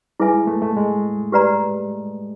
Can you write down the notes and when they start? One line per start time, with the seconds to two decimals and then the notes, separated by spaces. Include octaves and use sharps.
0.20 G3 E4 G#4 B4 E5 G#5
0.34 G#3
0.47 A3
0.62 A3
0.76 G#3
1.32 G4 B4 D5 F#5 A#5